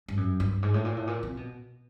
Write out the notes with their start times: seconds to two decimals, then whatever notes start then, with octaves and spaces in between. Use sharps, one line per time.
0.08 G2
0.17 F#2
0.40 G2
0.63 G#2
0.74 A2
0.85 A#2
0.97 A2
1.07 A#2
1.23 C3
1.37 B2